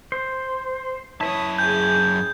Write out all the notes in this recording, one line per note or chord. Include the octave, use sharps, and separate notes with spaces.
C5
F#2 E4 B4 C#5 A5 D#6
G#4 G#5 G6